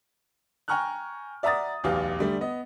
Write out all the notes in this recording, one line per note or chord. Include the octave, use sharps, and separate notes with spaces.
G5 G#5 A#5 C#6 F6 F#6
D5 E5 F#5 A#5 D#6 A6
D1 B1 E2 G4 F5
D3 G3 A3
B3 D#5